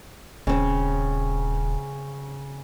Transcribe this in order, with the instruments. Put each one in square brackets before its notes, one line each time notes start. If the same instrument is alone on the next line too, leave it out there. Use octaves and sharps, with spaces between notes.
[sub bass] D#1 [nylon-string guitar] C#3 C4